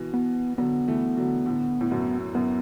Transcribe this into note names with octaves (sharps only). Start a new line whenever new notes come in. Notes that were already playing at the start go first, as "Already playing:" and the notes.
Already playing: B2 E3
B3
D3 F#3 B3
E3 A3
D3 F#3
A2 D3
A2
F#2 B2
F#2 B3